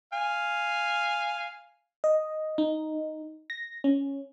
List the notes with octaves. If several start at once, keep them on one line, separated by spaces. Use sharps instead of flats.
F5 G#5
D#5
D#4
A#6
C#4